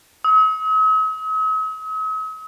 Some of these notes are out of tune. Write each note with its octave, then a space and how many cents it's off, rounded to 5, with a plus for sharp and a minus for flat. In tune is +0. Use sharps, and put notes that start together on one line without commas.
D#6 +45